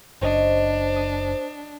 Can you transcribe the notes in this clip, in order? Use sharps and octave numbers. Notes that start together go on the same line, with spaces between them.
F#1 D4 C5 C#5 D#5
D#6